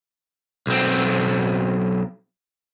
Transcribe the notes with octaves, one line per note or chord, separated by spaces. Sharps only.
B1 C4